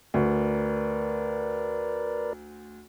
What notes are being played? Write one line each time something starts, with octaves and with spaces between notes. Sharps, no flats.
D2 A#4 B4 D5